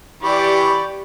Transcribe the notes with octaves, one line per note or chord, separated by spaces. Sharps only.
E3 G4 D5 B5 C#6